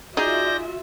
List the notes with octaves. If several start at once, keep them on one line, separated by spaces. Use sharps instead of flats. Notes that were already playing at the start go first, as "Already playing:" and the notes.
D#4 F4 F#4 G#4 D5 E5 G6 A#6